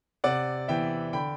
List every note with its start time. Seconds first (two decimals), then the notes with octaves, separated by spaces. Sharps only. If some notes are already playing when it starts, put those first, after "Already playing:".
0.24 C3 D5 F#5
0.68 E3 B3 E5 G5
1.13 D3 G5 B5